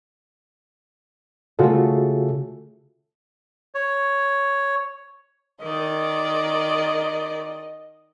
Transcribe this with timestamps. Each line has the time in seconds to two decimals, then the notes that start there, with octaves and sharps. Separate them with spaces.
1.59 C#3 A3 F4 F#4 A4
3.75 C#5
5.63 D#3 A#4 D5 D#5